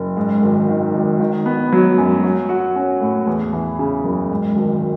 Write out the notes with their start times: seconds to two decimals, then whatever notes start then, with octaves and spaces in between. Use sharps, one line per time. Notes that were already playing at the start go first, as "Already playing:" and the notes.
Already playing: F#1
0.17 G#2
0.43 G#1
0.69 D#3
0.95 G#1
1.19 D#3
1.46 B3
1.72 F#3
1.98 F#2
2.24 F#3
2.49 F#4
2.76 C#4
3.01 A2
3.27 E2
3.53 E3
3.79 C#3
4.04 F#1
4.31 G#2
4.57 G#1